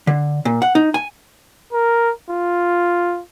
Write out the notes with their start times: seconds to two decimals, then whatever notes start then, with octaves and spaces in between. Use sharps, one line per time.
0.07 D3
0.45 A#2
0.62 F#5
0.75 D#4
0.94 G#5
1.73 A#4
2.30 F4